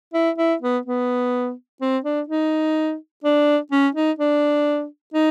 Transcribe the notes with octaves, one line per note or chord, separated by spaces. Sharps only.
E4
E4
B3
B3
C4
D4
D#4
D4
C#4
D#4
D4
D#4